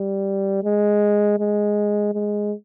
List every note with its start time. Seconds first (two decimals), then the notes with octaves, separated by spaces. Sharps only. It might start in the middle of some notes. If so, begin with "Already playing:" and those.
Already playing: G3
0.64 G#3
1.39 G#3
2.14 G#3